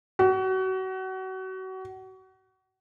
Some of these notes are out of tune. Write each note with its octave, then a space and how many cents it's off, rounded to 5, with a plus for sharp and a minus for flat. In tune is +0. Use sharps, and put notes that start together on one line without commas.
F#4 +30